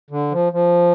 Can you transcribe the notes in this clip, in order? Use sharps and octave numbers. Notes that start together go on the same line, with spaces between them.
D3
F3
F3